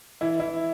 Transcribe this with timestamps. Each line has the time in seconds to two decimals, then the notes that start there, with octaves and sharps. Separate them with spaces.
0.21 E3 E4
0.40 E3 E4